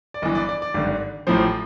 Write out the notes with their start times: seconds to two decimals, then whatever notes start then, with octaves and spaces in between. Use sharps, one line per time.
0.14 D5
0.22 G1 G2 E3 D#5
0.35 D5
0.49 D5
0.62 D5
0.74 G#1 G2 D3
1.27 A1 A2 F3 C5